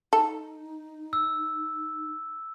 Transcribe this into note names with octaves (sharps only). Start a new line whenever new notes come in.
D#4 A4
E6